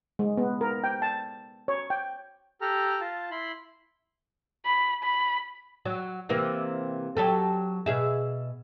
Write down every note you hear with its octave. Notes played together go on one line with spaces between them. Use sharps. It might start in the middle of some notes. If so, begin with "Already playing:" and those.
G#3
B3
A#4
G5
A5
C#5
G5
G4 A4 A#5 F6
F4 A5
E4 B5 C6
B5
B5
F#3
C3 E3 A#3
F#3 G4 A4
B2 G#4 E5